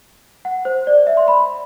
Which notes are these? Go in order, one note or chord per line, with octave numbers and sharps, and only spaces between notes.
F#5
C5
D5
E5
C6
B5